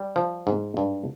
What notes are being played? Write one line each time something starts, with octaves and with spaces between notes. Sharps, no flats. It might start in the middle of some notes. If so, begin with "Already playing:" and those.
Already playing: G3
F3
G#2
G2